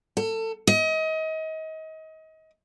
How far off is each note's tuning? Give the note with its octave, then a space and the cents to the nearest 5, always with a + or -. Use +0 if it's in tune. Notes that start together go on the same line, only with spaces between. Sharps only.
A4 +25
D#5 +30